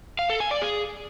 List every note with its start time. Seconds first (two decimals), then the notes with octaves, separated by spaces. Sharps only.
0.19 F5
0.30 A4
0.40 G#5
0.51 D5
0.62 G#4